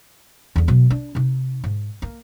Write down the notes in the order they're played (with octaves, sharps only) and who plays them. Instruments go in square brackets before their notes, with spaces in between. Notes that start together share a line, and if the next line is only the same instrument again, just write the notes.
[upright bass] E2 D3
B2 F#3
D4
C3 D#4
G#2
A#3